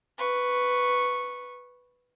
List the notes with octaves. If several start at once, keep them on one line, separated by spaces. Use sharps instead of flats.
B4 C#6